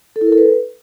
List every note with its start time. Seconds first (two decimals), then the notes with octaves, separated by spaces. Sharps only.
0.16 A4
0.21 E4
0.27 A#4
0.32 A4
0.38 B4